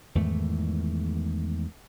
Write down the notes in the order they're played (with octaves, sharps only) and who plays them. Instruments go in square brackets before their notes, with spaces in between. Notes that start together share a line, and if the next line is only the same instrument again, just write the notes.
[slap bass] E2 G#2 D#3 A3